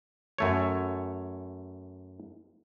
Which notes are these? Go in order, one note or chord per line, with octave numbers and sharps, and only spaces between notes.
F#2 A3 C#5